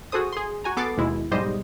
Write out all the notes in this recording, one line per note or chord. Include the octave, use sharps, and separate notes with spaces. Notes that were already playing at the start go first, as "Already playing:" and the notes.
F#4 G#4 A4 C5 D#6
G#4 C6
F#4 G#5 A#5
B3 A4 D6 A6 C7
D#2 B2 G#3 E4
B1 G#2 G3 G4 C5 D#5